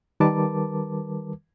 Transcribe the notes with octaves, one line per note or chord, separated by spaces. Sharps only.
D#3 G3 A#4 B4 A5 D6